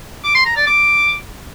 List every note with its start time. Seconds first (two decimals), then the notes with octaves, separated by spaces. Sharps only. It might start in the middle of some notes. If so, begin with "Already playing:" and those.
0.24 D6
0.35 C6
0.45 A#5
0.56 D5
0.67 D6